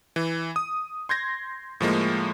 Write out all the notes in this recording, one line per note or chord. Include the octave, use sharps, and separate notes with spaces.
E3
D#6
C6 G6 G#6 A#6
A2 F3 G#3 A#3